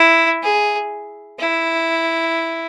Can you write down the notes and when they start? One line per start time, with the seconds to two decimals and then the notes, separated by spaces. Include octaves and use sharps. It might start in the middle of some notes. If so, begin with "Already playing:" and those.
Already playing: E4
0.43 G#4
1.39 E4